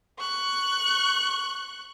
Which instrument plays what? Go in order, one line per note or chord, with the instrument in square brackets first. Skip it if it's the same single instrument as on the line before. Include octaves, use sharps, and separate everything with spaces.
[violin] C#6 F#6